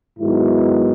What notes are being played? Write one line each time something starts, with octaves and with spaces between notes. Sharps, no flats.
G#2 D#3 F#3 B3 E4